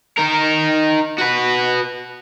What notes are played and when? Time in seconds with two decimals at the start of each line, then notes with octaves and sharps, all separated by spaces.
0.18 D#4 A#4
1.18 F#4 B4